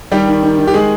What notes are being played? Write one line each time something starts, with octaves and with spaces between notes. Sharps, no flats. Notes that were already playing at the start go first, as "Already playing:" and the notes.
D#3 G3 G4
D#3
D#3
D#3
G4
G#3 G#4